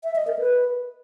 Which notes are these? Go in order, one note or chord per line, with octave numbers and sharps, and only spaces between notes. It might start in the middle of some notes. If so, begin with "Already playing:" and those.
E5
D#5
A#4
B4